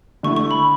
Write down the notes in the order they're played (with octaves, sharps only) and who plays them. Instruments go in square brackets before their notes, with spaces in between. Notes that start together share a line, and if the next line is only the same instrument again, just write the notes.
[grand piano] D3 A3 E4 [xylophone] C#6
[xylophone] C#6
B5